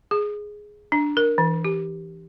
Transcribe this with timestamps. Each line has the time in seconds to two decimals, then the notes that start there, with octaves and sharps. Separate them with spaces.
0.11 G#4
0.92 D4
1.17 A#4
1.38 E3
1.65 G4